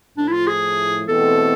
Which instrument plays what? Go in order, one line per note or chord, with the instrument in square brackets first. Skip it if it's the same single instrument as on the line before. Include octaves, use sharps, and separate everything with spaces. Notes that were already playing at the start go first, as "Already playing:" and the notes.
[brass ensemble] A2 F3 A3 [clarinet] D4
[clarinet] E4
F4
G#4
[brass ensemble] E2 B2 A3 C4 [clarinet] A4